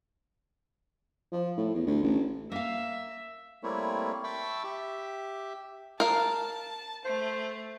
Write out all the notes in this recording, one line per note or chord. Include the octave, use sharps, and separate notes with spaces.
F3
A2
E2
D2
A1
A#3 E5 F5
G3 A3 A#3 C4 E4 C#5
E5 G5 A5 B5 C#6 E6
G4 E5
A#4 F5 A5
A3 C5